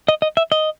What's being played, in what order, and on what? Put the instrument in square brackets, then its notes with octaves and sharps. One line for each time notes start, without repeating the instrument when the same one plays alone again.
[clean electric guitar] D#5
D#5
E5
D#5